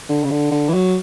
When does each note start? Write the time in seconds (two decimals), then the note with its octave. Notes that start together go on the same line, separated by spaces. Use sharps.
0.09 D3
0.24 C#3
0.31 D3
0.51 D3
0.69 E3
0.74 F#3